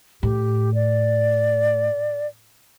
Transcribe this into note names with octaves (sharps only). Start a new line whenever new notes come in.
A2 G4
D5